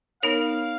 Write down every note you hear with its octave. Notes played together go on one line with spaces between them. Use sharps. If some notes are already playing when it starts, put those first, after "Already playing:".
B3 D#4 A#4 C#5 F5